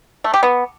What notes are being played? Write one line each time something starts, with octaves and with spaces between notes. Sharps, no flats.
A3
G4
B3